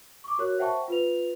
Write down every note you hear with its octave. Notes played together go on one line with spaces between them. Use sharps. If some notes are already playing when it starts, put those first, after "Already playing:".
C#6 D6
F#4 A#4 C#5 F#6
C5 E5 F#5 G5 A5 C#6
F4 B4 F7